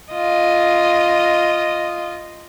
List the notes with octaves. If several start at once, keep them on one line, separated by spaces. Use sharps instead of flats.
F4 D#5